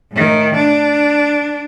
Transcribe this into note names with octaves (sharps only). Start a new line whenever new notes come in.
A2 D#3
D4